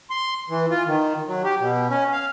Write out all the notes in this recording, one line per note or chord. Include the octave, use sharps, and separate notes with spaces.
C6
E3
F4
D#3
F#3
G4
B2
C#4
F5